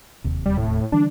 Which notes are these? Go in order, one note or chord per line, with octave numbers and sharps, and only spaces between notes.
E1 D#2 C3
G3
A2
D3 E3 G3 D4